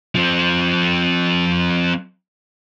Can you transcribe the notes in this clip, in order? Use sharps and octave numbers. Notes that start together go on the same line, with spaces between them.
F3 C4